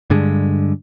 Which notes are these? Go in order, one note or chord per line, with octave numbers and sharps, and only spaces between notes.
G2 D3 G#3